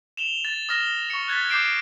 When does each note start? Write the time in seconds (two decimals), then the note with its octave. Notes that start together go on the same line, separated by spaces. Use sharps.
0.17 E7 F7 G7
0.45 A6
0.69 D#6 F6 A#6 E7 G7
1.10 C#6 C#7
1.28 F#6 G#6 A6 B6
1.49 D6 G6 C7 D7 E7